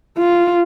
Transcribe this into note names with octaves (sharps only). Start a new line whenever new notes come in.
F4